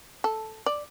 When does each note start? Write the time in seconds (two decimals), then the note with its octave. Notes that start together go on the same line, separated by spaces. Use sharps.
0.24 A4
0.66 D5